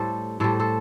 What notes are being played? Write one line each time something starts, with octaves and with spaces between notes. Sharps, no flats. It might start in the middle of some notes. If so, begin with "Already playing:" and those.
Already playing: A2 G3 A4 C5
A2 G3 A4 C5
A4 C5